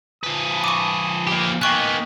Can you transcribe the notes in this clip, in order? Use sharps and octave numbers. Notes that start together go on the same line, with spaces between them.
F3 B4 G#5 A5 D#6
C#6 D6
A#3 G4
A#3 B3 D#4 D#5 G5 G#5 C#6 F#6